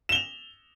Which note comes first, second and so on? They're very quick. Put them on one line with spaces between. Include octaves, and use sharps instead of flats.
E7 G7 F7